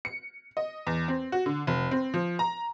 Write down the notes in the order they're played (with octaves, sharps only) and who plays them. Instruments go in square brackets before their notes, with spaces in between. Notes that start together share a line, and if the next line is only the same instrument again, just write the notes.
[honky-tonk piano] C#7
D#5
E2
C4
F#4
D3
F1
C4
F3
A#5